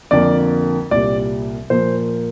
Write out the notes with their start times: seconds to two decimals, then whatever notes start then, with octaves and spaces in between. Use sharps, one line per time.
0.11 F2 D3 F3 A#3 D5
0.91 C2 A#2 G3 D5
1.70 A#2 F3 A#3 C5